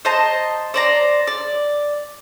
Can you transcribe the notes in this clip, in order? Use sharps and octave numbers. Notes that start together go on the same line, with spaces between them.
C5 D#5 A5 A#5
C5 D5 A#5
D5